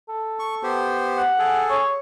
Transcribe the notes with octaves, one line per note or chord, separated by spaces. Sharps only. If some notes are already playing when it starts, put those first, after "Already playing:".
A4
C#6
B3 G4 C5
F#5
G#4 A4
C#5